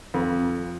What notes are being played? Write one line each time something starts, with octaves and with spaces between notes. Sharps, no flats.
F2